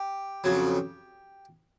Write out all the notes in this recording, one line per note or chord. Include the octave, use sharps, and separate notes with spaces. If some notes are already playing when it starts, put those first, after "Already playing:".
Already playing: G4
F2 C#3 F#3